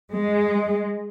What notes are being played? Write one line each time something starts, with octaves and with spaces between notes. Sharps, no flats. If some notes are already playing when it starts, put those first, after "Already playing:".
G#3